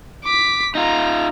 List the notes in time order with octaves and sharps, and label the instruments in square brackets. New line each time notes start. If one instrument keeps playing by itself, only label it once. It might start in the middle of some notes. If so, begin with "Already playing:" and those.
[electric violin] D6 B6
[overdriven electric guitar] D#4 F4 [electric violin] A#5